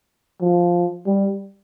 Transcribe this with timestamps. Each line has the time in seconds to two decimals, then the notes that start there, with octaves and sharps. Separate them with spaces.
0.41 F3
1.06 G3